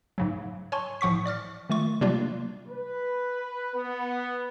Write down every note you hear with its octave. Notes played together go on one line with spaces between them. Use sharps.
G#2 C#3 F#3
C#5 G#5 A5 C6 C#6
A2 F3 F#5 C#6 B6
D5 D6 F6 A6
D#3 A3 F4 C#6
C3 F#3 G3 A#3 D4 F4
B4
B3